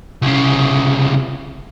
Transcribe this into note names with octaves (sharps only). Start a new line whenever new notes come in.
C2 C#3